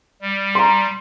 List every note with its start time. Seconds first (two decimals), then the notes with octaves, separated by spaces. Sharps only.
0.21 G3
0.55 A#5 C6